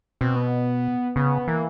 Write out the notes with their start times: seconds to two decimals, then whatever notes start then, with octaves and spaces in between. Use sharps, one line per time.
0.21 B2 C4
0.36 B3
1.16 C#3 B3
1.48 E3 A#3